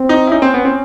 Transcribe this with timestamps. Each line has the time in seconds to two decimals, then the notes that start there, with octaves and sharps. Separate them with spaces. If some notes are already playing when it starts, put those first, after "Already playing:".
Already playing: C4
0.09 D#4
0.27 E4
0.31 C#4 D#4
0.42 C4
0.54 B3
0.65 C4